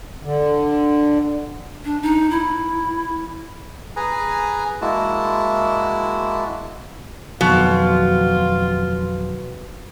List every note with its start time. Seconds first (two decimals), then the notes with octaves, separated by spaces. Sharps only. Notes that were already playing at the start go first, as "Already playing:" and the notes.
0.24 D3
1.85 D4
2.02 D#4
2.31 E4
3.96 G#4 B4 G#5 A#5
4.81 G#3 A#3 E4 F#4 A5
7.41 F2 B2 D#3 F#3 F4